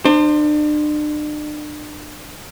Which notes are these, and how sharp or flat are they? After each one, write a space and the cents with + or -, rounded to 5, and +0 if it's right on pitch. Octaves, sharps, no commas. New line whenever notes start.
D4 +35 C5 +0